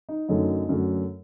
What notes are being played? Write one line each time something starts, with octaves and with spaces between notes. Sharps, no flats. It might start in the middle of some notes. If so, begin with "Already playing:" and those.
D#4
F#2 D3 F#3 A3 D#4
F#2 D3 F#3 A3